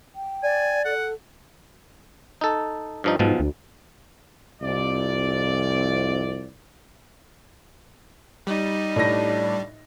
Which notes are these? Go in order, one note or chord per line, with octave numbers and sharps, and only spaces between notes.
G5
D5 G#5
A4 F#5
D#4 A4
G2 F3 D#4
B1 G#2 B2 F3
D2
C2 F2 D5
G3 D#4
A2 D4 A#6